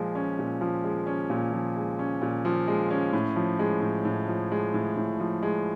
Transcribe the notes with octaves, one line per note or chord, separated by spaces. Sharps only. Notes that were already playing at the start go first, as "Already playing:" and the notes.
Already playing: A#2 F3 G#3
C#4
A#2
F3
G#3
C#4
A#2
F3
G#3
C#4
A#2
F3
G#3
C#4
A2
F3
G#3
A2
A2
F3
G#3
A2
A2
F3
G#3